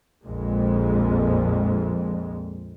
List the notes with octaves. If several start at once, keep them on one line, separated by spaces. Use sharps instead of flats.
A#1 F2 A#2 G#3